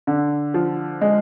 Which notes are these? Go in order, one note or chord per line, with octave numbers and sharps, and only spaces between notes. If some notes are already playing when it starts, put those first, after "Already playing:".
D3
F3
G#3